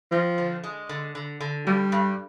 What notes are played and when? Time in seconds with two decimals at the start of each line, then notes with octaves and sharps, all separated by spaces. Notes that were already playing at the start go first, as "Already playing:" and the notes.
0.11 F3 C4
0.38 D3
0.64 G#3
0.89 D3
1.15 D3
1.41 D3
1.67 G2 G3
1.92 G2